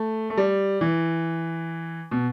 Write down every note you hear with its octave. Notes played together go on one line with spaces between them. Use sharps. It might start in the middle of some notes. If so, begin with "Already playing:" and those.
Already playing: A3
A3
G3
E3
B2